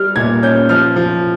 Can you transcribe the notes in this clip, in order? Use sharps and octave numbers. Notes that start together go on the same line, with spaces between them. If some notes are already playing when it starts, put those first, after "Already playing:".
Already playing: G3 F6
A#2 G#6
C#4 G6
F3 F6
F3